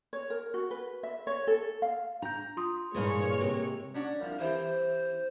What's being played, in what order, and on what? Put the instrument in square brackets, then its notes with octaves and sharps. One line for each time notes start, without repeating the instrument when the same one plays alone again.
[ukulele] C#5
A#4
F#4
B4
E5
C#5
A4
F5
[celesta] D4 G6 [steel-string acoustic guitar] A#5
[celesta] F4 C6 D#6
[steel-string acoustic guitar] G2 A#2 E3 [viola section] G#3 A#3 C#5
[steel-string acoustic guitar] C3
[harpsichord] C#4 D4 F#4
C2 F3
[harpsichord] C3 E3 G5 [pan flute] C5